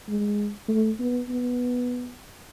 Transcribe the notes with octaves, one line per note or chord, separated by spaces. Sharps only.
G#3
A3
B3
B3